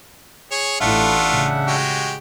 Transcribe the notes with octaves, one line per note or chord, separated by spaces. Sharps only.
G#4 C#5
A1 A2 A3 D4 F4 E5 F#5
C#3
G#3 F#4 G4